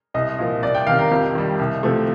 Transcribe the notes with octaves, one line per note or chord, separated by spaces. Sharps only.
C2 D#5
A#2 F3
C2 D5
G5
C3 D#3 F5
A#4
F2 G4
D#3 G3
C2
C3 F3 A3